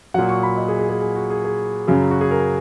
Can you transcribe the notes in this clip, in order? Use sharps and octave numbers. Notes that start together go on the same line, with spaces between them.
A#2 F#3 F#5
C#6
B5
D#5
G#4
G#4
G#4
G#4
F#4
G#4
G#4
F#2 C#3 F#3
F#4
G#4
A#4